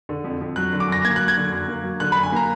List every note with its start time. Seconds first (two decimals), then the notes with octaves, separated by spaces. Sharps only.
0.09 D3
0.24 F2
0.41 F2
0.56 F#3 F#6
0.73 D3
0.80 D6
0.88 F#2 A#6
1.05 A#3 G#6
1.16 F#3 F#6
1.28 G#6
1.37 D3
1.52 F#2
1.68 A#3
1.84 F#3
2.00 D3 F#6
2.12 F#2 B5
2.23 G#5
2.32 A#3 A#5